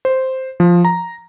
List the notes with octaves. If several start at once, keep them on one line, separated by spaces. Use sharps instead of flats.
C5
F3
A#5